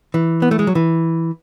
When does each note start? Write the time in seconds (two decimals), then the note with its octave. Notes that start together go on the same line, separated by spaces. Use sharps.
0.14 E3
0.42 B3
0.51 A3
0.59 G#3
0.67 F#3
0.75 E3